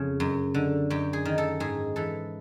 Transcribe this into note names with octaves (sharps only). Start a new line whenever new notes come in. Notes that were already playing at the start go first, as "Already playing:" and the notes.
Already playing: F2 C#3
F#2
D3
F#2 G4
G#4
D#3
A4
G#2 G#4
E3 A4